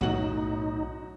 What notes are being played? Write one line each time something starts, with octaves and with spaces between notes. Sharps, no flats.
B1 F#2 A2 F#3 D#4 F#4 F#7